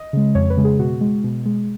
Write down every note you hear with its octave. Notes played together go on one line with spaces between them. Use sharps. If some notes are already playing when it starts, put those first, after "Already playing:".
Already playing: D#5
C#3 G#3
F2 C#5
B4
C#3 G#3
G#4
B2 F#4
G#3
B2
G#3